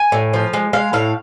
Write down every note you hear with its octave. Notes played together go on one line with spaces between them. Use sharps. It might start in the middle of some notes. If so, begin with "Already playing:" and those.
Already playing: G#5
A2
F3
G#3
G#3 F5
A2 F5